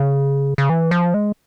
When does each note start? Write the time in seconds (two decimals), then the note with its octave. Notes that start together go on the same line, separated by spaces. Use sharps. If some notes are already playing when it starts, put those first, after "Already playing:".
Already playing: C#3
0.58 C#3
0.70 E3
0.91 F3
1.14 G#3